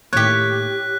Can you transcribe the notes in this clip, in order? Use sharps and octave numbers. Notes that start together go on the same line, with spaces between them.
A2 D#3 A#3 G4 C#5 F#6 B6